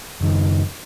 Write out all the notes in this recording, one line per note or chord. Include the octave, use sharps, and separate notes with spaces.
F#1 D#3